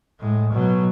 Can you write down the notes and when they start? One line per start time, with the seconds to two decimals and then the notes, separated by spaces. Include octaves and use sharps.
0.20 A2 G#3
0.52 B2 F#3